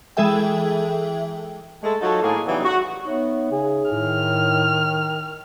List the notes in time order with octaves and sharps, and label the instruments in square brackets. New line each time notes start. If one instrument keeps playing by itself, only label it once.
[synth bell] E3 G#3 G#4 A4 E5 G5
[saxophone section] G#3 A3 A4
F#3 D#4 F4 F#4 A4
A2 A#3 G#4
C#3 E3 F#3 G3 B3 D#4
F#4
[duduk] B3 [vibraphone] D#4 C#5 E5
[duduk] C#3 [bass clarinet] G#4
[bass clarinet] A2 [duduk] D#3 [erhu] F6